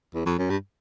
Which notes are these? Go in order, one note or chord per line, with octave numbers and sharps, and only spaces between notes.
E2
F2
F#2
G2